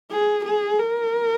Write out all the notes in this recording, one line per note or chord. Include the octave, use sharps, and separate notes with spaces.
G#4
G#4
A#4